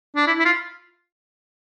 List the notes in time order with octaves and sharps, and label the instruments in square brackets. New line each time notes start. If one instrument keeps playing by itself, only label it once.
[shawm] D4
E4
E4
F4